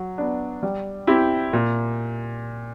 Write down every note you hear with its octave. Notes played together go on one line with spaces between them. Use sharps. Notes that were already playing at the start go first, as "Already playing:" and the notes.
Already playing: F#3
B3 D4
G3
C4 E4 G4
A#2